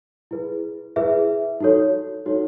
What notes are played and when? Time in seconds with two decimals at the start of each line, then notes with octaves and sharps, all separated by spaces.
0.31 E4 G#4 B4
0.96 E4 G#4 B4 E5
1.61 D#4 F#4 A4 C#5
2.26 D#4 F#4 A4 C#5